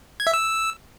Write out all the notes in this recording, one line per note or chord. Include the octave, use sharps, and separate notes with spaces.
G#6
E5
E6